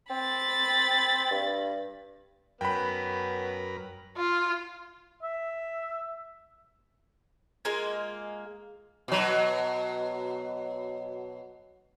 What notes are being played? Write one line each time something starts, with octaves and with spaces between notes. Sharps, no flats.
C4 B5 A6
G2
F#2 B3 C#4 A#4 B4 G5 B5
F4
E5
G#3 A#3 F4 G#5
B2 F#3